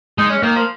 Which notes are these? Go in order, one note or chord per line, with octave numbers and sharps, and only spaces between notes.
G#3 D#4
C#4
D#3 A#3
F3